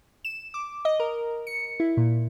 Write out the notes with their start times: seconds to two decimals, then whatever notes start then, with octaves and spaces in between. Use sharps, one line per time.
0.25 E7
0.54 D6
0.85 D#5
1.00 A#4
1.47 C#7
1.80 E4
1.97 A#2